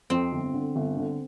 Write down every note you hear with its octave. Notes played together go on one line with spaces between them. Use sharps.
F2 C4
G1
D3
G1
D3